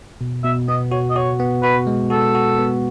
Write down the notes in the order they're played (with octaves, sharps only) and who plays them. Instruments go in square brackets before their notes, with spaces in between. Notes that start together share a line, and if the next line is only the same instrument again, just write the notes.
[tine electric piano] B2
[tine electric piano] B2 [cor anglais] E5
[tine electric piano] B3 [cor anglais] D#5
[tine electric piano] F#4 [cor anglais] C#5
[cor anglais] D#5
[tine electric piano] F#4 [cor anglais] C#5
[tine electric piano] B3
[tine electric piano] F#4 [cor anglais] B4
[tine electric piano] G#3
[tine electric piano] F#4 [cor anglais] A4
[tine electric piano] F#4
B3